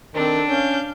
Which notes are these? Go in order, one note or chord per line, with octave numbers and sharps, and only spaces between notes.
D#3 C4 D4 A4
C#4 F5 G6